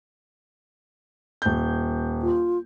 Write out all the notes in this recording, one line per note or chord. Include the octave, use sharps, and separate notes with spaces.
D#1 G6
F4